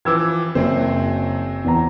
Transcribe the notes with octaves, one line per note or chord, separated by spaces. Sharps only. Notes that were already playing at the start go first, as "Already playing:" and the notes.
E3 F3 D6 E6 G#6
F#1 F#3 C4 C5
E2 A#5